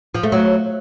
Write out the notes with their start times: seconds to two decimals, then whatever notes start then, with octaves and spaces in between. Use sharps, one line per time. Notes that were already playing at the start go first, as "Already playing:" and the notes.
0.15 F3
0.23 A3
0.32 F#3